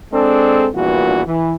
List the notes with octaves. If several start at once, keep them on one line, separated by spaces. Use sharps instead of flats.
G#3 C4 D4 G#4 A4
A#1 E2 G2 A#2 E3 F#4
E3